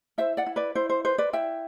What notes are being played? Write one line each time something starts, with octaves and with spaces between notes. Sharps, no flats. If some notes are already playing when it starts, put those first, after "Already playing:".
E4 C5 E5
D5 F#5
E4
B4 D5
E4 C5
C5
B4 C5
B4 D5
E4 E5 G5